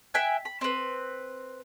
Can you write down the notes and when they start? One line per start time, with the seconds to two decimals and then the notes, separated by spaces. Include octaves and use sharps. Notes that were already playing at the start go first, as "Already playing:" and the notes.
0.14 E5 G5 G#5 F#6
0.45 B5
0.61 C4 B4